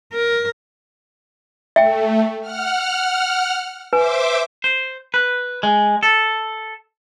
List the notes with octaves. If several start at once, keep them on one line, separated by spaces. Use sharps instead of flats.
A#4
A3 E5 G5
F#5 F6
B4 C5 E5 G#5 D6
C5
B4
G#3
A4